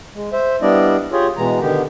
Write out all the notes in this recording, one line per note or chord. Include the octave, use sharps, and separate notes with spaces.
G#3
C5 E5
G3 B3 D4 E4 D5 D#5
F4 G4 G#4 C#5
B2 E3 G#3 A#5
D3 D#3 B3 G4